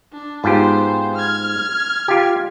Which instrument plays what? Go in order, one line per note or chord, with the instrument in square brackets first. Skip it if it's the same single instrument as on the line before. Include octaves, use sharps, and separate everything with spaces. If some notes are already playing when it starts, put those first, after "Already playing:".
[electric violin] D4
[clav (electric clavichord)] G#2 F4 G4 [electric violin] B3 C5
[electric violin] F6 G#6
[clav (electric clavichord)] F4 G4